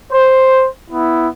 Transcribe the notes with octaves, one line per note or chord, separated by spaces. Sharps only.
C5
B3 E4